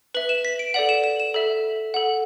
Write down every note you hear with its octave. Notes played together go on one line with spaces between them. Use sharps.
B4 E5 F#7
E7
B6
D7
A4 D5 F#5 F#7
E7
E7
E7
A4 E5
A4 F#5